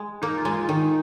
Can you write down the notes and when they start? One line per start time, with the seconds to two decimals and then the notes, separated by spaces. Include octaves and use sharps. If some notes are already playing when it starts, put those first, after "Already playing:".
Already playing: G#3
0.22 A#3 D#4
0.37 F4
0.45 G#3
0.53 F4
0.68 D#3 D#4